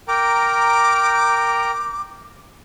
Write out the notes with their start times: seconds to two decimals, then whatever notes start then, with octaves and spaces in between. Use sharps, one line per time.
0.08 A#4 G5 A#5 D6